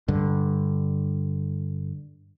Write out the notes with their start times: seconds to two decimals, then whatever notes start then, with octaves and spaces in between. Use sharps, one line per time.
0.08 G2 D3